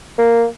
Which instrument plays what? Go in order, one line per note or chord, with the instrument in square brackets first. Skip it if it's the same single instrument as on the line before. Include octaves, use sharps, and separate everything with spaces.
[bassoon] A#3